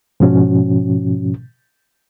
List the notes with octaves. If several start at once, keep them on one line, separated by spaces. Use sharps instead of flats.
G#2 B2 F3 C#4 F#4